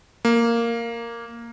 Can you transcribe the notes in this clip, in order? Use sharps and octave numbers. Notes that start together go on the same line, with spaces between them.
A#3